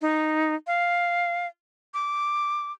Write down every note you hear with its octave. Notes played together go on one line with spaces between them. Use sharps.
D#4
F5
D6